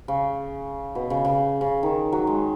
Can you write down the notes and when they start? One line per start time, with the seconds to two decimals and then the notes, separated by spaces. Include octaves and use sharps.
0.08 C#3
0.95 B2
1.10 C#3
1.25 C#3
1.61 C#3
1.83 D#3
2.12 F#3
2.27 G#3